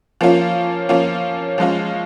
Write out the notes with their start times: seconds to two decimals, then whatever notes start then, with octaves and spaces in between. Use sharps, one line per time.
0.21 F3 A#3 C#4 F4
0.89 F3 A#3 C#4 F4
1.58 F3 G#3 C#4 F4